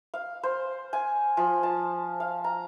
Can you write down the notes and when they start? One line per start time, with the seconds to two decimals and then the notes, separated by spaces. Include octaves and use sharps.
0.14 F5
0.43 C5
0.93 G#5
1.37 F3
1.63 A5
2.20 F5
2.44 A#5